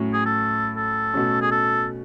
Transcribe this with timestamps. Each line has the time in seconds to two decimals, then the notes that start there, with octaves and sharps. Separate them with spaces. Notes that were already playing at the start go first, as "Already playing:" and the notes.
Already playing: A2 F#3 C#4
0.13 G#4
0.26 A4
0.76 A4
1.14 B2 A3 C#4
1.42 G#4
1.52 A4